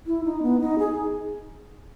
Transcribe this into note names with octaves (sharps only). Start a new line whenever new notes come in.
E4
D#4
B3
D#4
G#4